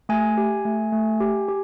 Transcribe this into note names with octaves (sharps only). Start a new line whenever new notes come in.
A3 G#5
G4
A3
A3
G4
G4